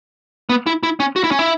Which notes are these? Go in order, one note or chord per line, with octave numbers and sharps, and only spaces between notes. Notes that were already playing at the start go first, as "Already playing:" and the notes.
B3
E4
E4
C#4
F#4
E4
C#4
E4